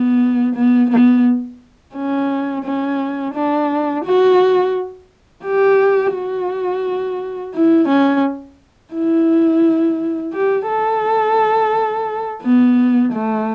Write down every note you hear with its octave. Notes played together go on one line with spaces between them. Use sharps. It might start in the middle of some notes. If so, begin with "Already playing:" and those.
Already playing: B3
B3
B3
C#4
C#4
D4
F#4
G4
F#4
E4
C#4
E4
G4
A4
B3
A3